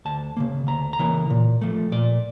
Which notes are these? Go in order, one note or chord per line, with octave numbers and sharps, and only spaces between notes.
D2 A5
C#3 E3 A#3
D2 A#5
A#5
C#3 E3 A#3
A#2
F3 A3
A#2 D5